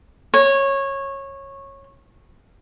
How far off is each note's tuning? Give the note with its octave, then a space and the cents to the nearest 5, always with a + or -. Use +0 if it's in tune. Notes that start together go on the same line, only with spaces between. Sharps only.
C#5 -15